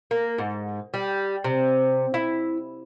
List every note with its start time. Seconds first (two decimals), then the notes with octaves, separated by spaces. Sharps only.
0.11 A#3
0.38 G#2
0.94 G3
1.44 C3
2.14 E4